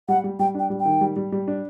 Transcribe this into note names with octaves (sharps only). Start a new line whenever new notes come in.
G3 F#5
G3
G3 G5
D4 G5
G3
G5
D#3
G3
G3
G3
D4